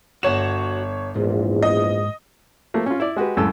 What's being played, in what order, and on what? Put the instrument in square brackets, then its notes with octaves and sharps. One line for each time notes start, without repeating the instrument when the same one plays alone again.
[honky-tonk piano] G1 C#5 E7 [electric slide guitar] F#4
[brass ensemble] A#1 E2 [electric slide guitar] G#2
[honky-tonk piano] D#5
[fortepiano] F3 A3 A#3
C#4 F4
E4 D5
G#3 F#4 G4 B4
C#2 F#2 A2 A4 E6